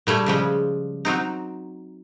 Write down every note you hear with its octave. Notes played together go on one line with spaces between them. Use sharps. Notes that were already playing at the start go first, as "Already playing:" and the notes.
A#2 G3 A3 C#5
C#3 F3 G3 G#3
F#3 C4 D#4